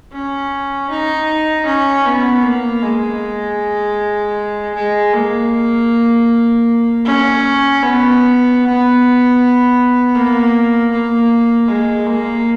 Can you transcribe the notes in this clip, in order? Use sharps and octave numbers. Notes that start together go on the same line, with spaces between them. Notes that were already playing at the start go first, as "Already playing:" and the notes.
C#4
D#4
C#4
B3
A#3
G#3
G#3
A#3
C#4
B3
A#3
A#3
G#3
A#3